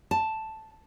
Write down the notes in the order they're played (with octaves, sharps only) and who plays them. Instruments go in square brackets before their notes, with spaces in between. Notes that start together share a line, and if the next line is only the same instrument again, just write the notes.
[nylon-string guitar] A5